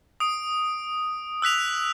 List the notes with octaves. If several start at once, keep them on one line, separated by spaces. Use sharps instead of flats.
D#6 D7
E6 F#6 B6 F7